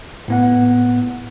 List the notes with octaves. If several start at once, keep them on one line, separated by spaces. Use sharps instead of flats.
A2 B3 F#5